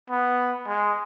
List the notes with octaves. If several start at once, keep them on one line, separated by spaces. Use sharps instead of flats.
B3
G#3